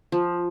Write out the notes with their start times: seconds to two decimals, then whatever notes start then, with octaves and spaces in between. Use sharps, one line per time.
0.12 F3